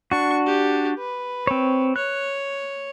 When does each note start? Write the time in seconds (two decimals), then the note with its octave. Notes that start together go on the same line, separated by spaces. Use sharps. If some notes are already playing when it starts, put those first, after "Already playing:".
0.12 D4 F#4 C#6
0.46 G4
0.99 B4
1.47 C4 C#5
1.96 C#5 F#6